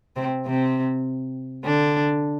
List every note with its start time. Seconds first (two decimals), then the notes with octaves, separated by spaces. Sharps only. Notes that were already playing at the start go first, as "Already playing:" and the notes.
0.16 C3 C4
0.46 C3 C4
1.64 D3 D4